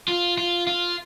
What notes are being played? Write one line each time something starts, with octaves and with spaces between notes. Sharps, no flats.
F4
F4
F4